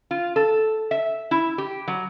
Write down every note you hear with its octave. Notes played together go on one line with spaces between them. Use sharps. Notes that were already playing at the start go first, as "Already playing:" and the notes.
F4
A4
E5
E4
G4
F#3